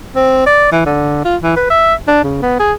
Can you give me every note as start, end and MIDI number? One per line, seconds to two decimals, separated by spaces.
0.16 0.42 60
0.46 0.67 74
0.72 0.85 52
0.86 1.21 50
1.25 1.36 65
1.42 1.55 52
1.56 1.67 71
1.70 1.94 76
2.08 2.22 62
2.24 2.40 49
2.42 2.59 59
2.59 2.73 68